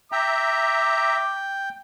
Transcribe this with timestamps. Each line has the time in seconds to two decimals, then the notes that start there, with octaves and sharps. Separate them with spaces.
0.12 E5 G5 A#5 D6